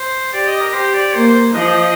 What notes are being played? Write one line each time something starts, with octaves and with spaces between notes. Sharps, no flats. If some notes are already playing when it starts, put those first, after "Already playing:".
Already playing: C5
G4 D5
D#5
A#4
G4 C5
D5
A#3 C5
C5
F3 D#5